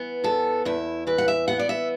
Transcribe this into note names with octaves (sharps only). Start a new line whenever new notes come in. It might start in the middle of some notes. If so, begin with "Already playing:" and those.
Already playing: E3 B3
E2 A4
E2 E4
E3 B4
F#5
E5
B3 F#5
D5
E5